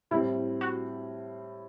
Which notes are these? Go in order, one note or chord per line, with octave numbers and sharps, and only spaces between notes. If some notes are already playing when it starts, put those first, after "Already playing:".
A2 G3 C4 E4
F#4